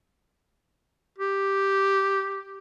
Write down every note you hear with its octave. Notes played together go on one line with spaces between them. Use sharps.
G4